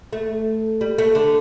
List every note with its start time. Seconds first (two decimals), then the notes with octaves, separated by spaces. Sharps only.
0.13 A3
0.81 G3
0.98 A3
1.15 D3